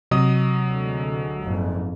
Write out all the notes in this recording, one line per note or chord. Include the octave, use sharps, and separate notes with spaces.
C3 F#3 D#5 D#6
D2 D3 G#3
F#1 F2 G#2